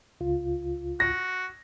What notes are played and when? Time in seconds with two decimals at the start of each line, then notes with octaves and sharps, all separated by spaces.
0.21 C#2 F4
1.00 F#4 A#6